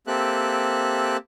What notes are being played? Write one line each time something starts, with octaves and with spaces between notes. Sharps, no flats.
A#3 C4 G4 A4 E5 F#6